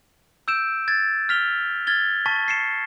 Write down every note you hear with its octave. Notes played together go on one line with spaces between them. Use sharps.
E6 G6 D7 E7
G#6 A6
F6 B6 F7 G7
F6 G#6 A6 G7
A5 C#6 A6 B6
C7 C#7 E7